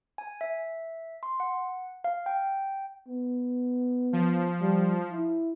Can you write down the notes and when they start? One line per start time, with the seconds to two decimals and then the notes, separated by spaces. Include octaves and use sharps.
0.18 G#5
0.41 E5
1.23 C6
1.40 F#5
2.04 F5
2.26 G5
3.08 B3
4.13 F3
4.61 G3
5.11 E4